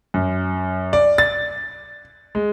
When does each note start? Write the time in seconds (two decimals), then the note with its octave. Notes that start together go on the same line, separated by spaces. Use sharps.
0.14 F#2
0.93 D5
1.18 A6
2.35 G#3